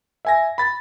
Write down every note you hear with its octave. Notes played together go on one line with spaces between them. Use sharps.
E5 G#5 A#6
B5 A6